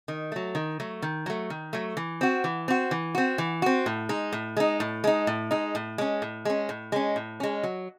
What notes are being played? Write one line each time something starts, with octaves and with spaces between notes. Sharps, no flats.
D#3
F#3 A3
D#3
F#3 A3
D#3
F#3 A3
D#3
F#3 A3
E3
C4 F#4
E3
C4 F#4
E3
C4 F#4
E3
C4 F#4
A2
G#3 D#4
A2
G#3 D#4
A2
G#3 D#4
A2
G#3 D#4
A2
G#3 C#4
A2
G#3 C#4
A2
G#3 C#4
A2
G#3 C#4
F#3